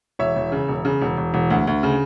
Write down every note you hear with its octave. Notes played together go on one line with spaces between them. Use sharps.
E1 C#5 E5
E1
C#3
E1
C#3
E1
E1
E1
D2
D2
C#3